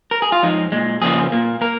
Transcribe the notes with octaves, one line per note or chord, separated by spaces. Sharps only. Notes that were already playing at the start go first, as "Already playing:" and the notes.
A#4
G#4
F4
F2 F3 G#3 D#4
A#2 G#3
F2 C#3 F3 A#3 G#4
A#2 A#3
A#3 A#4